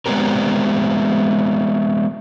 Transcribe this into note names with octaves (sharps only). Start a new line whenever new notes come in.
G#3 B3 C4 D4 G4 A#4